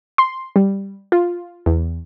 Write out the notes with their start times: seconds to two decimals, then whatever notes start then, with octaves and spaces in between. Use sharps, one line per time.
0.18 C6
0.56 G3
1.12 F4
1.66 E2